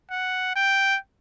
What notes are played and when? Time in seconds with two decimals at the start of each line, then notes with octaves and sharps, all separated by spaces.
0.10 F#5
0.56 G5